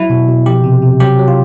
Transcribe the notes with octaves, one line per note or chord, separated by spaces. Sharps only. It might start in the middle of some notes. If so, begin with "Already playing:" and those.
Already playing: F#3 E4
B2
B2
F3 G4
C3
C3
F#3 G4
F#3
F4